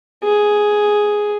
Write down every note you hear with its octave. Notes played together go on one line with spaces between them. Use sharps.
G#4